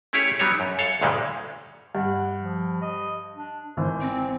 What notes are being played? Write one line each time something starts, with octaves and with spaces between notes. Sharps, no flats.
A3 C#4 E4 G4 G#4 C#5
F#3 G3 B3 D4 D#4 C#5
F#2
A4 C#5 F5
D2 G2 A#2 D3 G3 G#3
G2 F#5
F3
D#5
D4
G#1 E3 C5
C4